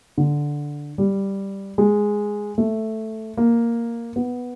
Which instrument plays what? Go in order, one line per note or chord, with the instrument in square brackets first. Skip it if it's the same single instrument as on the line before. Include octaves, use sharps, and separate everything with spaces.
[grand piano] D3
G3
G#3
A3
A#3
B3